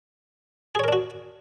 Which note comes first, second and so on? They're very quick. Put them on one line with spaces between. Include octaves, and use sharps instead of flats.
G#4 C#5 A#4 D4 F#4